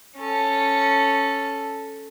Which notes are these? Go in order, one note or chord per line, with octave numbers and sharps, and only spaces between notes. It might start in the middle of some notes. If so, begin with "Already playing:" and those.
C#4 A4